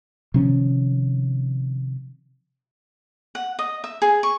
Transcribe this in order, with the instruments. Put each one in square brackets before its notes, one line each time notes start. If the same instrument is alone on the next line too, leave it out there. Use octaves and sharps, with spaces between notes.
[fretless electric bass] C3 D#3 F3 C#4
[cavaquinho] F#5
D#5
E5
G#4
C#6